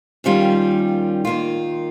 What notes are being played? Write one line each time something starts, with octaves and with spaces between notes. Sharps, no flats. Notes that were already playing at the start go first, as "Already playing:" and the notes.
D#2 D#3 G3 C#4 F4
D#3 A#3 F4